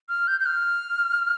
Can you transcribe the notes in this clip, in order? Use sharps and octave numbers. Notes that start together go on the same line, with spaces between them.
F6
G6
G6
F6